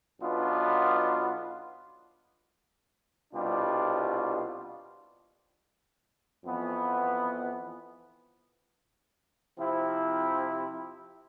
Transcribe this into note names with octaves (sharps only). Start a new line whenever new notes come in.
B1 B2 B3 D4 F4
C2 B2 G3 D4 F4
F2 E3 B3
C3 F3 C4 E4